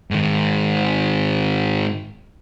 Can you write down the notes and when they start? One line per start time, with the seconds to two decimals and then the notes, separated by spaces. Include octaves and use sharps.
0.11 G#2 D#3